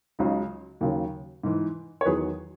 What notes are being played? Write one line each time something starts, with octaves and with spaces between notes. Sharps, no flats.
C#2 C#3 F#3 D#4
D#2 C#3 F#3
G#2 E3
C#5
E2 D#3 F#3 G#4 B4